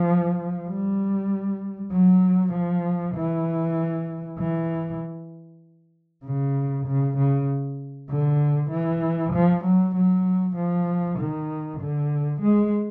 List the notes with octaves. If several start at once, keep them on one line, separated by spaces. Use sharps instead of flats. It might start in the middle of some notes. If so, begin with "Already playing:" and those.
Already playing: F3
G3
F#3
F3
E3
E3
C#3
C#3
C#3
D3
E3
F3
F#3
F#3
F3
D#3
D3
G#3